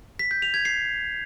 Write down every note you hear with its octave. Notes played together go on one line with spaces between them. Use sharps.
B6
G6
F7
G#6
C7